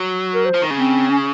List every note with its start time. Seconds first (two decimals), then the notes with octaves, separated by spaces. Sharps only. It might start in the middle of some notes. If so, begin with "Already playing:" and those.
Already playing: F#3
0.34 A#4
0.46 C5
0.54 F3
0.62 D#3
0.70 C#3
0.78 C4
1.11 C#4